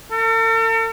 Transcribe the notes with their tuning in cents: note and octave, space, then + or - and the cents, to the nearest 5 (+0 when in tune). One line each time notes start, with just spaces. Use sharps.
A4 +45